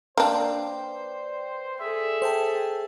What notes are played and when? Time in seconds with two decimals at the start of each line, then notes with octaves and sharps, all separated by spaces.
0.17 A#3 D4 B4 C5 D5 G5
1.80 G#4 A4 E5
2.22 C5 G5 A5